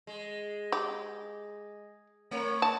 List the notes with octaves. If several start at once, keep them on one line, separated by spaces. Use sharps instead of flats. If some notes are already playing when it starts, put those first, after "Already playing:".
G#3
G4
A3 A#4 C#5
A5